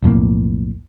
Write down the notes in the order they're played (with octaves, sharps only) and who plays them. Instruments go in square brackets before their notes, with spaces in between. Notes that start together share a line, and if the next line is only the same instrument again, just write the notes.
[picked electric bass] B1 F2 A2 A#3